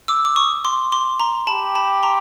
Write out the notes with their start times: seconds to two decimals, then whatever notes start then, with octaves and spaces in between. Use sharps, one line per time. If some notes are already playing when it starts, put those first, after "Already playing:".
0.08 D6 E6
0.25 D6
0.36 C#6 D#6
0.64 C6 D6
0.92 C6 D6
1.20 A#5 C6
1.47 G4 A5 B5
1.75 A5 B5
2.03 A#5 C6